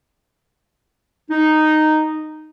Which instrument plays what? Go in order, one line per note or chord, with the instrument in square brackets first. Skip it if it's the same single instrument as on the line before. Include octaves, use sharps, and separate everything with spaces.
[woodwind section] D#4